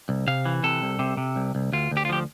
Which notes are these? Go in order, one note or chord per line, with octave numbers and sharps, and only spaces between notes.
C2
C3 F5
E3
C3 A4
C2
C3
C3
C2
C2
D2 F4
D2
G4
F4
F3 G4